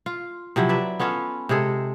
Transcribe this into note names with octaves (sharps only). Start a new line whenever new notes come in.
F4
C3 F3 F#3 E4
B4 D5 E5
B3 C#4 F4 A4
C3 G#3 G#4 A4